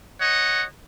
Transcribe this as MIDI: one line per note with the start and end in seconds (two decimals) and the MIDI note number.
0.21 0.64 73
0.21 0.64 75
0.21 0.64 78